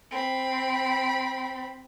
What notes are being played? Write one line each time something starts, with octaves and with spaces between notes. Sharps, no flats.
C4 B5